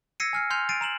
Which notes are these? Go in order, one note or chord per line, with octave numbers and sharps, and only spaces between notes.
E6 G#6 A#6 C7 C#7 D#7
G#5 F6 C7
G#5 C6 F6 G6 C7 F7
A6 C7 D7 D#7
A#5 E7 F#7